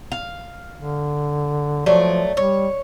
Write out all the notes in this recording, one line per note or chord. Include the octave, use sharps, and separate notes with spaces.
F5
D3
F3 F#3 A3 D5
G3 C#5